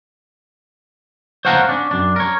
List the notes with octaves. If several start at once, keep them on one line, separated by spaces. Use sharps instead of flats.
C5 C#5 F5 F#5 A5 A#5
C#4 D4
F#2 D4
A#4 C#5